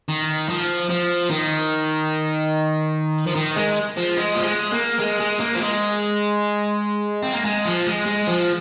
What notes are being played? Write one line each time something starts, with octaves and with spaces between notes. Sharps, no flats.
D#3
F3
F3
D#3
F3
D#3
G#3
F3
G#3
F3
G#3
A#3
G#3
G#3
A#3
F3
G#3
C4
A#3
G#3
F3
G#3
G#3
F3